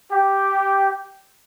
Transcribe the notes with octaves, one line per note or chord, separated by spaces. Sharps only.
G4